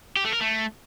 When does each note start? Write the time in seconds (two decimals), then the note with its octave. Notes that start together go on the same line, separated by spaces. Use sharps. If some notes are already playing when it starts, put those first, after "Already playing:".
0.16 G4
0.24 A3
0.33 A#4
0.41 A3